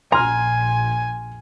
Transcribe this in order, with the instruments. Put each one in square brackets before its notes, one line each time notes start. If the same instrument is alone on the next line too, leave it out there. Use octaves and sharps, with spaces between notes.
[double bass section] A#1 [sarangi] G#5 [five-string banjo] A#5 [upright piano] C6 F6